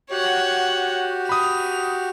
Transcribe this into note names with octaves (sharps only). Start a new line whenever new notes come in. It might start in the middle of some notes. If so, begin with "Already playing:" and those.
F#4 G4 C#5 F#5
B5 D#6 F7